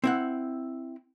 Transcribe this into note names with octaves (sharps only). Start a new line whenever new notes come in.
C4 E4 F#5